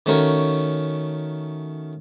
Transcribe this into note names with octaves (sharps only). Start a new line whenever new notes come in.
D#3 A3 C#4 F#4 A#4 C#5